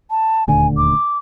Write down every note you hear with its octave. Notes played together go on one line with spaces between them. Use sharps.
A5
D#1 D2 D3 G#5
D6